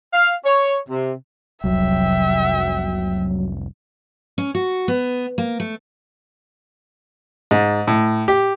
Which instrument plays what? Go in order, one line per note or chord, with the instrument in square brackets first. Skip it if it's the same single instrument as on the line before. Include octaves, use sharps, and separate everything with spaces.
[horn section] F5
C#5
C3
[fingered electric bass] F1 C2 [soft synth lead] F#3 [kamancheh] E5 G5
[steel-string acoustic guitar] C#4
F#4
B3
A#3
A3
[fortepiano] G#2
A2
G4